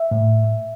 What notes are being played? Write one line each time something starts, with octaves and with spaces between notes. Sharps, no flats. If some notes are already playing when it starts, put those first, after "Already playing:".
Already playing: E5
A2